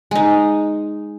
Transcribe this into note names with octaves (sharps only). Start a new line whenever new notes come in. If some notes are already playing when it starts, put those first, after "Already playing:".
G#3 D#4